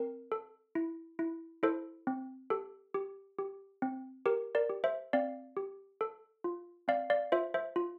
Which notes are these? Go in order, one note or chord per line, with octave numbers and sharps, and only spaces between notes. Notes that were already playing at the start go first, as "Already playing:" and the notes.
Already playing: C4 A#4
A4
E4
E4
E4 A4 C5
C4
G4 A4
G4
G4
C4
G4 A#4
A#4 D5
G4
C5 E5
C4 D5 F5
G4
A4
F4
C4 D5 F5
D5 F5
F4 C5 E5
C5 E5
F4